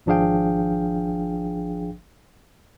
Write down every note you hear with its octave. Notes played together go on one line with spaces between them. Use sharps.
G#1 F3 D4 G#4 F5 G5